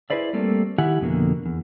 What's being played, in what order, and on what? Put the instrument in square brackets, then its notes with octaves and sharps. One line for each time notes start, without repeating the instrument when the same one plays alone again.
[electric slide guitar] E4 G#4 B4 C5 D5 E5
G3 A3 A#3 C4 A4 D5
D#3 E4 G4 E5 F#5 G#5
F2 B2 D3 A#3
E2